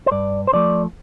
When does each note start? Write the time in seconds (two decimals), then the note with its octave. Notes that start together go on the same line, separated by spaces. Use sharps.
0.06 C5
0.12 G2 D5
0.47 C5
0.53 D3 F3 A3 D5